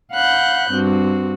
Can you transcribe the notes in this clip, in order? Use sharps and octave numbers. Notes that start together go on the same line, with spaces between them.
F5 F#5 B5 F#6 G6
G2 C4 F#4